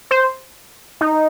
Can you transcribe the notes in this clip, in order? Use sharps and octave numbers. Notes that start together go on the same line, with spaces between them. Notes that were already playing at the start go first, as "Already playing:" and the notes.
C5
D#4